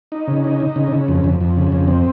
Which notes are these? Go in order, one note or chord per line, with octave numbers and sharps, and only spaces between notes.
D#4
C#3
D#4
D#4
C#3
C#3
F2
F2
F2
C#3
F2
C4